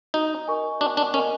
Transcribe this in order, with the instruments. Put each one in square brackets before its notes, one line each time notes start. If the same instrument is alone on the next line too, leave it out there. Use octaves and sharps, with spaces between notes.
[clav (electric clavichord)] D#4 [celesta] F#4
[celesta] A#4 D#5 G#5 C#6
[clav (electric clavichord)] D4 [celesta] F#4
[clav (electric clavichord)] D4
[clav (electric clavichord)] C#4 [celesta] A#4 D#5 G#5 C#6